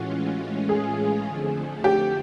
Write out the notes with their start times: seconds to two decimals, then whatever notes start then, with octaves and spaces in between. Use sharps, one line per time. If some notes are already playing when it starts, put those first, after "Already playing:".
Already playing: A2 E3 G#3 C#4 F4 F#4
0.69 G#4
1.27 F2 D3 F3 A3
1.84 G4